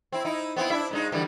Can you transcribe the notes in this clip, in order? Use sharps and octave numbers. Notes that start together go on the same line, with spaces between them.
C4 E4
D#4 E4
B3 C4 E4
D4 E4 E5
A#2 G#3 D#4
D3 E3 G3